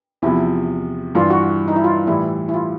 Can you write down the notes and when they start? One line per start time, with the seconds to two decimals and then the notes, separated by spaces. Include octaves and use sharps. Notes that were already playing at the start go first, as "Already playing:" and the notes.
0.22 E2 C3 F3 E4
1.15 G2 E3 G3 F4
1.30 F#4
1.68 D#4
1.76 E4
1.84 F4
2.07 A2 E3 G3 E4
2.49 E4
2.54 F4